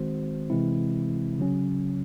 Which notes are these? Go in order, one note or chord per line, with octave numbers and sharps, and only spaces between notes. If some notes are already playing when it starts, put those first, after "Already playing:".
Already playing: D#3 G#3 C4 F#4 C5
C3 E3 G#3 C4 E4
C#3 F#3 C#4